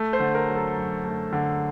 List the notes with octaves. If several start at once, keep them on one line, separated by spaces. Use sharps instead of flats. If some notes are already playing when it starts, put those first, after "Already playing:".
Already playing: A3
C5
D3
A#4
F#3
A4
F#2
A3
D3